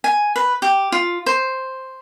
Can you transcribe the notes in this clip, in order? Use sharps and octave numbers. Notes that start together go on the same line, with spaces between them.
G#5
B4
G4
F4
C5